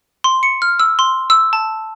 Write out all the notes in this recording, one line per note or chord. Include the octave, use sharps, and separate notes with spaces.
C6
C#7
F6
E6
C6
E6
A5